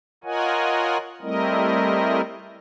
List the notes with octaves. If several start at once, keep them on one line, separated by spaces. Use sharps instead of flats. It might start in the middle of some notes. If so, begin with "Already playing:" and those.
F4 A#4 C#5 D#5 F#5 G#5
G3 A3 C4 E4 A#4 D#5